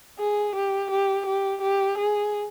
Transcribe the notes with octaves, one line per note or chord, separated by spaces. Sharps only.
G#4
G4
G4
G4
G4
G#4